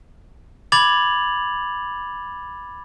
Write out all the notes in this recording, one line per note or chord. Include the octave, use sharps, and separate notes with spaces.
B5 D6 G#6 A6 F7 F#7